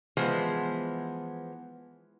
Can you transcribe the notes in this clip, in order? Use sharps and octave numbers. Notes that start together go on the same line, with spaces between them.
E3 F3 G#3 B3 C5